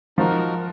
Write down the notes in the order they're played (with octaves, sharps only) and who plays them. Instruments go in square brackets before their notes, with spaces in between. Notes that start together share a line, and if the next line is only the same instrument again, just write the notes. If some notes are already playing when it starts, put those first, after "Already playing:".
[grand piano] F3 [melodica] D#4 F#4 A#4